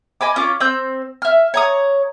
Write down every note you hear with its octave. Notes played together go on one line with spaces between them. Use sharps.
D#5 G#5 B5 D6
C#4 F4 D6
C4 E6 G6
E5 F6
C#5 A#5 D#6